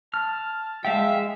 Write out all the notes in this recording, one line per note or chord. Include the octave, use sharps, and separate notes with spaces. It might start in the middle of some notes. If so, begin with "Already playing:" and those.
A5 F6
G#3 E5 F5 G5